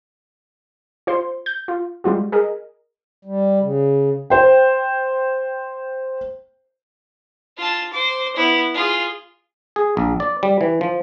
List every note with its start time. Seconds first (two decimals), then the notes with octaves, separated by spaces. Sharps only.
1.07 F4 C5 C6
1.46 G6
1.68 F4
2.04 G3 G#3 F4 F#4
2.32 G#4 A#4 D#5
3.25 G3
3.61 C#3
4.30 C5 G5
7.57 F4 A5
7.93 C5 D6
8.36 B3 E4
8.74 F4 G#4
9.76 G#4
9.97 A#1
10.20 D5
10.43 G3
10.61 E3
10.81 F3